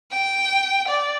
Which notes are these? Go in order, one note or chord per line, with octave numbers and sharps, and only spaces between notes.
G5
D5